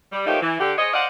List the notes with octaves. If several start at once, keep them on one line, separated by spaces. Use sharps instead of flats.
G3
F3 A3 A#3 D#4 G4 C#5
E3
D3 G4
G#4 C5 C#5 D#5
C5 D5 D#5 F5 F#5